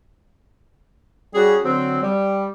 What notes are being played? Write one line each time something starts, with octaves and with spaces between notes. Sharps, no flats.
G3 C#4 F#4 G#4
D3 F#3 C4
G3